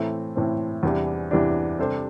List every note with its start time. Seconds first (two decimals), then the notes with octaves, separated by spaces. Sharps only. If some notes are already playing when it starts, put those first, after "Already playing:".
Already playing: A2 E3 A3 C4
0.36 A2 E3 A3 C4
0.83 E2 C3 E3 G3 D4
1.31 E2 C3 E3 G3 D4
1.79 C3 G3 D4 A4 C5